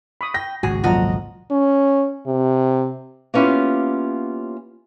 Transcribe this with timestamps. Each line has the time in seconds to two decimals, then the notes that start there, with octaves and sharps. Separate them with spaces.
0.21 B5 C#6 D#6
0.34 G5 A#6
0.63 G#1 C#2 G#2 F#4 G#4 G#5
0.84 F2 A#2 F#3 F4 F#4 D#5 A5 A#5
1.51 C#4
2.26 C3
3.34 A#3 B3 C#4 E4 F4 G4